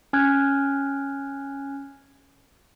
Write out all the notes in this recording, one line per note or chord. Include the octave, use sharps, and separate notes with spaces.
C#4 G#5 F6 F#6 G#6